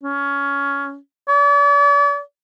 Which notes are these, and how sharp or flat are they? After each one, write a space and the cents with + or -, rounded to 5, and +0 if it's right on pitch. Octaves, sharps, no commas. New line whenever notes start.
C#4 +15
D5 -40